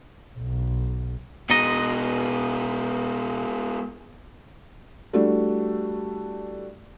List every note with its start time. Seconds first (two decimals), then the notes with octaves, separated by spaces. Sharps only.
0.39 B1
1.50 B2 G#3 B3 D#4 D#5
5.13 G3 A3 D4 E4 F#4